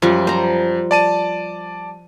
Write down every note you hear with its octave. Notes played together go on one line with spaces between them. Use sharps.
F#2 F3 G3
C5 A#5
D5 A5 D#7